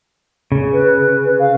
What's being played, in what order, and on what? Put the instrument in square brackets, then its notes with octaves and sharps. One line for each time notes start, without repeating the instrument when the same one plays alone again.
[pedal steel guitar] C#3
[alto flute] B4
F5